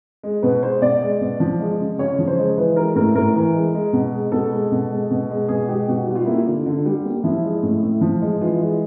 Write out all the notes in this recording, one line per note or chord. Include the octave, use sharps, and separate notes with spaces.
G#3
B2 B4
G#3 C5
B2 D5
G#3
B2
F3
G#3
C#3
C#3 C#5
F3
C5
G#3
E3 B4
G#3 A#4
A2 A#4
A2 A#4
E3
G#3
G#3
B2
G#3
B2 A4
G#3
B2
G#3
B2
G#3
B2 G#4
G#3 G4
B2 F#4
G3 F#4
F4
A#3 E4
F4
D3
D3
G3
A#3
F3 E4
G#3
A2
A2
F3
G#3
E3 F4
G#3